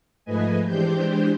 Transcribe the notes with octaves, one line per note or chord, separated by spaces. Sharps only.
G#2 F3 A3 B4 D#5 G#5
E3 G#3 D4 G4 C5 G6